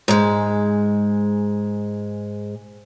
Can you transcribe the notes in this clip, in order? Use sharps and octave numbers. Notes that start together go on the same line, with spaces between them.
G#2 G#3